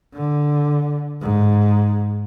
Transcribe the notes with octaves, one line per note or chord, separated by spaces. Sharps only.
D3
G#2